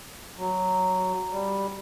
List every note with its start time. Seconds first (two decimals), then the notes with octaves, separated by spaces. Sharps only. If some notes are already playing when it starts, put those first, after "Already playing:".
0.38 F#3
1.32 G3